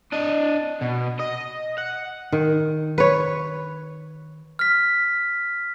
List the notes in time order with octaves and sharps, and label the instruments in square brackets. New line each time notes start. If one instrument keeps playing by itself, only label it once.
[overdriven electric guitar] D4 D#5
B2
D#5
F#5
[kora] D#3
B4 C#5
[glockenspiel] F6 B6